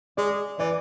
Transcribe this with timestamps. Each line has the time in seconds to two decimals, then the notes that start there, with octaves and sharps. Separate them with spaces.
0.17 G#3 D5
0.59 E3 D5